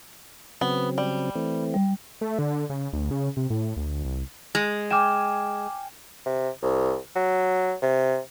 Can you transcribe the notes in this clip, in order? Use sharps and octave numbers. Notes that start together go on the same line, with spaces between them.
C#3 F#3 B3 C4
G3
E3 A3 C4
G3
A3
D3
C#3
D2
C#3
C3
A2
D2
C2
G#3
G5 G#5 D6 F6 E7
C3
C2
F#3
C3